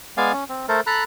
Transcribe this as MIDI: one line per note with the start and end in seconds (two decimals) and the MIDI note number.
0.17 0.32 56
0.17 0.32 59
0.17 0.32 74
0.17 0.32 77
0.17 0.32 80
0.33 0.44 61
0.49 0.66 60
0.68 0.81 57
0.68 0.81 69
0.68 0.81 70
0.68 0.81 72
0.87 1.04 69
0.87 1.04 82
0.87 1.04 83
0.87 1.04 90